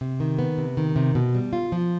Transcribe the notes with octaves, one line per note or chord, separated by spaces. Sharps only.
C3
D#3
B3
C3
D#3
C3
B2
G3
F4
F3